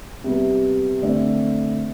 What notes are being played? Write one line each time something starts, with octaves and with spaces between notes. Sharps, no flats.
C3 G3 B3
D3 A3 C4